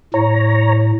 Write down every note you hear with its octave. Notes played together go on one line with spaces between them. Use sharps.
A2 C#5 A#5